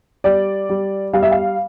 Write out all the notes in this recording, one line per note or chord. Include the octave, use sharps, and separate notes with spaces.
G3 D5
G3
G3 F5
E5
F5